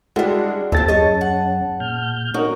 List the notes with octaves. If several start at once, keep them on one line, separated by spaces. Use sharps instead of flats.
G3 G#3 D4 E4 F#4
D#2 D3 C4 F4 E5 A5 A6
F#2 C#4 G#4 C#5 D#5
F#5
A#2 F6 G6
A#3 C#4 D#4 F#4 A#4